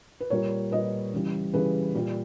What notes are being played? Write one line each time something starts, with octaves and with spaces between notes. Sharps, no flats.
B4
A#2 G3 A#4 C#5
A#2 G3 B4 D#5
C#3 E3 G3
C#3 E3 G3 G#4 B4
A#2 G3